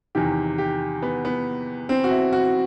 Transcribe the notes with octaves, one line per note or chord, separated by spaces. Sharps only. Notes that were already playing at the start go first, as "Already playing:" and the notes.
E2 C3 D#3 G4
G4
B3
B3
C4
F#4
E4
F#4